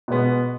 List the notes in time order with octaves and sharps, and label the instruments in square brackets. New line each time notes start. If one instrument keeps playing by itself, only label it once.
[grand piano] B2 G#3 B3